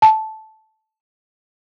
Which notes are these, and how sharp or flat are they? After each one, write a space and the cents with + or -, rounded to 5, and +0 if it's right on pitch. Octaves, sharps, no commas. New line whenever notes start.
A5 -10